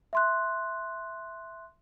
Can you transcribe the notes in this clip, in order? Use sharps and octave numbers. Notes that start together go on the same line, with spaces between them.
E5 C6 F#6